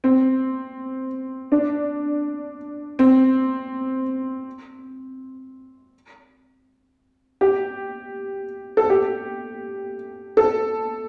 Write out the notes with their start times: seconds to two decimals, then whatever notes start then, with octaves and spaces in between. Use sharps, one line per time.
0.04 C4
1.52 D4
2.99 C4
7.41 G4
8.77 A4
8.90 G4
10.37 A4